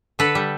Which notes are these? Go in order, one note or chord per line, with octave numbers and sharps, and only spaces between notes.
D3 A4 B4
G3